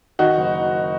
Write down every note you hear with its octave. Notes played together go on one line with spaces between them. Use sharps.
D#3 D#4 F#4
F#1